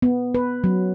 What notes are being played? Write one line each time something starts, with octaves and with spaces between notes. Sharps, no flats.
B3
B4
F#3